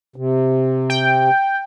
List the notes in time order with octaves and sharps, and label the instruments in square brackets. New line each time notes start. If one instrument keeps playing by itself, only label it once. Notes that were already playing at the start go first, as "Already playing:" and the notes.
[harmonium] C3
[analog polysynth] G5